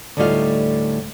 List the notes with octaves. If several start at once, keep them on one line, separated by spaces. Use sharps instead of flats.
D2 A2 G3 D#4 F4 F5